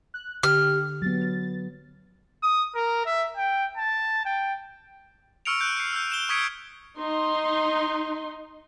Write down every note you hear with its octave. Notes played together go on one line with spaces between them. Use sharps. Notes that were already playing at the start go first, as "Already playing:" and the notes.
F#6
D3 G4 F6
F#3 B3 A6
D#6
A#4
E5
G5
A5
G5
C#6 E6 F6 C#7 D7 F7
F#6 G6 D7
C7 C#7
E6 F6 G6
D7 E7 G7
C#6 D#6 G#6 B6 C#7 D7
D#4 C6